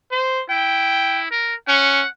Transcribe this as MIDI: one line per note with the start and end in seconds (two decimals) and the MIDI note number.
0.11 0.41 72
0.50 1.27 64
0.50 1.22 79
1.31 1.55 70
1.68 2.03 61
1.68 2.08 78